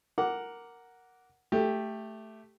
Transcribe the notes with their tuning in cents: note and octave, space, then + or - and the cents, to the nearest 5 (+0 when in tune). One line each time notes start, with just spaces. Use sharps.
A#4 +0 F#5 +0 D6 -10
A3 +0 G4 +5